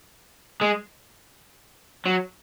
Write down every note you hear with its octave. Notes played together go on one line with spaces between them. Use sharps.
G#3
F#3